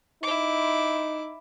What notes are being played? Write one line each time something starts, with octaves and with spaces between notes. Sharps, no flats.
D#4 E4 D6